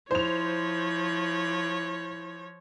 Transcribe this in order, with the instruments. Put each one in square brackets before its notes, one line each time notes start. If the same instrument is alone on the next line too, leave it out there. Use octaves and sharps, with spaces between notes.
[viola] F3 C#5 [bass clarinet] E4 [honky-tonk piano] C5 F7